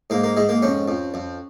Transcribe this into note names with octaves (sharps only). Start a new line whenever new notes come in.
G#2 A#3
A#3
G#2 G#3
A#3
F2 C#4
F2
F2